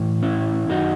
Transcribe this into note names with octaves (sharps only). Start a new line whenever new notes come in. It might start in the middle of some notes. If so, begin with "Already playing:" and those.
Already playing: A2 E3
C#4 E4
F#2 D#3 D#4 F#4